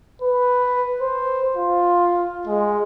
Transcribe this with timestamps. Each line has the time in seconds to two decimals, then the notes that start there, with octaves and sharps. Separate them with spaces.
0.22 B4
1.01 C5
1.57 F4
2.47 G#3